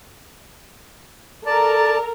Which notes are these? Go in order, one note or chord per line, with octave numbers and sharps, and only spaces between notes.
A4 A#4 D5 A5 A#5